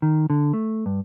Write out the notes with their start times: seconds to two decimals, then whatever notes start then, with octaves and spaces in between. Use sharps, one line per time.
0.02 D#3
0.30 D3
0.53 A3
0.86 G2